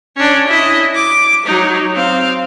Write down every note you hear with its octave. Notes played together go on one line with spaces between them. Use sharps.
C#4 D4
E4 D#5
D6
F#3 D#4
C4 F5